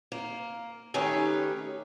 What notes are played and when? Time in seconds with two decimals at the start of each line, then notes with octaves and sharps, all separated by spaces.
0.12 A#3
0.94 D#3 A3 C#4 D#4 G4 B4